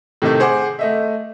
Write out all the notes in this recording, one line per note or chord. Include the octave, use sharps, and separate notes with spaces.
A2 C3 D#3 A3
G#4 C5 F#5 D6
A3 D#5 E5